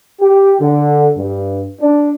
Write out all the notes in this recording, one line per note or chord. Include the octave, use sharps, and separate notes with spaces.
G4
D3
G2
D4